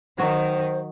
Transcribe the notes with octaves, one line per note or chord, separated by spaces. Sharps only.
D#3 F#3 F#4 C5